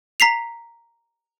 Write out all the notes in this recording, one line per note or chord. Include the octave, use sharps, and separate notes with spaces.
A#5 B6 C7 F7